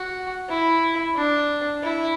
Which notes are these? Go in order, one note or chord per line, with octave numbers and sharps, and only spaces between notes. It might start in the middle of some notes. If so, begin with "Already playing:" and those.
Already playing: F#4
E4
D4
E4